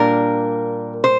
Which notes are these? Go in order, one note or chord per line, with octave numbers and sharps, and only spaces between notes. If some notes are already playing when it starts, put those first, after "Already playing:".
Already playing: A#2 G3 A#3 D4 A#4
C5